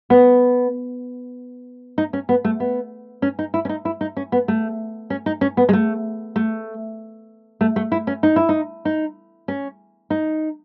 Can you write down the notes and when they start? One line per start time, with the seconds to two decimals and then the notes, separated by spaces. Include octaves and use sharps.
0.10 B3
1.98 D#4
2.13 C#4
2.29 B3
2.45 A3
2.60 B3
3.22 C#4
3.39 D#4
3.54 E4
3.65 C#4
3.69 D#4
3.85 E4
4.01 D#4
4.17 C#4
4.32 B3
4.48 A3
5.10 C#4
5.26 D#4
5.41 C#4
5.57 B3
5.69 G#3
5.73 A3
6.36 A3
7.61 A3
7.76 A3
7.92 E4
8.07 C#4
8.23 D#4
8.36 E4
8.49 D#4
8.85 D#4
9.48 C#4
10.10 D#4